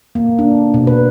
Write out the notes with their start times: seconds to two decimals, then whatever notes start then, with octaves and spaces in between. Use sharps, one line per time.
0.15 A#3
0.39 D4
0.74 B2
0.87 B4